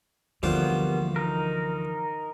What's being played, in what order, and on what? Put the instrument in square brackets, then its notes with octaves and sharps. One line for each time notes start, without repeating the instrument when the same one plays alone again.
[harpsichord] D2 F4 C5 [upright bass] E3 F3 [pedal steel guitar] G3 A#3 B3
[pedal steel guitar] D#4 A#4